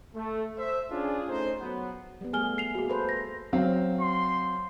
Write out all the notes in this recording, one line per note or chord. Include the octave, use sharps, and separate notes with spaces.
A3
C5 E5
C#4 D4 F4 G#4
A3 C#4 D#4 C5
F#3 B3
G3 B3
A3 G#4 G#5 F6 G7
C7 F7
A#3 F#4 G#4
A4 B4 C5
A#6
F#3 C4 F5
C6